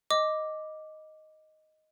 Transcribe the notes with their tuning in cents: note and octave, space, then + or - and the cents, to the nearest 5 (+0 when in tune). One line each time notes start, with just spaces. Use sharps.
D#5 +0 D6 +0